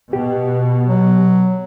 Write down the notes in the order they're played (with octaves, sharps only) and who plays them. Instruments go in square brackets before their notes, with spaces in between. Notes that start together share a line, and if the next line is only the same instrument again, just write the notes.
[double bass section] B2 [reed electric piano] G4
[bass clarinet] F#3